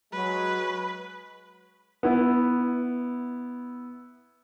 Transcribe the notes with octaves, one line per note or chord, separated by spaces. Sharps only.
F#3 G#3 B4
B3 E4